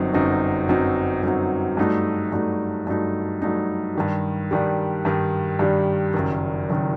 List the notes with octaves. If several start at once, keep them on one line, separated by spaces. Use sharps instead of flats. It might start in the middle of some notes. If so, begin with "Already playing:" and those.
Already playing: G1 F#2 F#3 C4 D#4
G1 F#2 F#3 C4 D#4
G1 F#2 F#3 C4 D#4
G1 F#2 F#3 C4 D#4
G2 F#3 A3 D#4
G2 F#3 A3 D#4
G2 F#3 A3 D#4
G2 F#3 A3 D#4
G2 D#3 G3
G2 D#3 G3
G2 D#3 G3
G2 D#3 G3
F#1 F#2 D#3
F#1 F#2 D#3